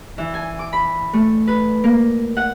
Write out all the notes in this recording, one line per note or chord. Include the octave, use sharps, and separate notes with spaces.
E3
G#5
D6
B5
A3
B4
A#3
F#5